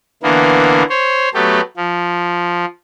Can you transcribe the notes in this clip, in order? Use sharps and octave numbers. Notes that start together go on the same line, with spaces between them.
D3 E3 A#3 B3
C5 C#5
F#3 A3 B3 G4 A4
F3